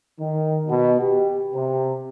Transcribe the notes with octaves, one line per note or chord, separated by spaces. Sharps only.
D#3
B2
G4
C3